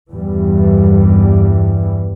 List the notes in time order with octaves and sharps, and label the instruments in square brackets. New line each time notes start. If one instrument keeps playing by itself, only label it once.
[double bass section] E2 G2 E3 G3